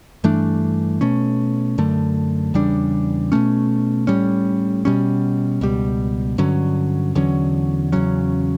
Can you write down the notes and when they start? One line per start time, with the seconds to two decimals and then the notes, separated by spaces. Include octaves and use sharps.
0.24 G2 E3 A3 D4
1.01 B2 A3 C#4
1.78 F#2 D3 A3
2.54 E2 C#3 G3 D4
3.32 B2 A3 C#4
4.07 A2 G3 C#4
4.85 B2 G3 C#4
5.61 C#2 B2 G3
6.38 G2 D3 F#3 C#4
7.15 E2 D3 F#3 C#4
7.92 E2 C#3 F#3 C#4